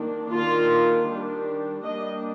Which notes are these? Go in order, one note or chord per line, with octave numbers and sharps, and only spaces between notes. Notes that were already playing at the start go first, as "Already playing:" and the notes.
Already playing: D#3 A#3 D4
D#3 A#3 D4 F4
D#3 G3 D4
G3 A#3 D4 D#5